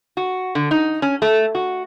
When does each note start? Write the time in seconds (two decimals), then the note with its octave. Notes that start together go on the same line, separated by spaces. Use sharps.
0.17 F#4
0.55 D3
0.71 D#4
1.02 C#4
1.22 A3
1.55 F#4